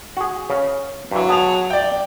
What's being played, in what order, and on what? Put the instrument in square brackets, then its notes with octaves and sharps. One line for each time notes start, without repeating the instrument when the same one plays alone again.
[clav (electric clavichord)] F#4 G#4
C#3
[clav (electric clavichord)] G2 E3 [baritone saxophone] F#3
[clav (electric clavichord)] B3 G#4 [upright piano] A5 F7
[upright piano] D5 G5